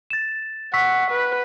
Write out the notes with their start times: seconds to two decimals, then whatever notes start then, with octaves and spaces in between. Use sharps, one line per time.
0.10 A6 E7
0.74 F#5 C#6 E6 B6
1.11 B4